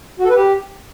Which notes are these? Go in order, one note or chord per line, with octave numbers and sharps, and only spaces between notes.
F#4
A4
B4
G4